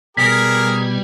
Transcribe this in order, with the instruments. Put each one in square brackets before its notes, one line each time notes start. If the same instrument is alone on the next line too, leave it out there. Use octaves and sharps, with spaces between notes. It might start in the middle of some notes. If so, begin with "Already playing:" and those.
[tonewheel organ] B2 G#6 [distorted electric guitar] G3 [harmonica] G#4 A#4 [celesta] B6